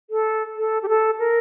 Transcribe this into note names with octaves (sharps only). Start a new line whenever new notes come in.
A4
A4
G4
A4
A#4